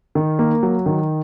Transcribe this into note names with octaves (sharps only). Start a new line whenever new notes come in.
D#3
A#3
F#3
D#3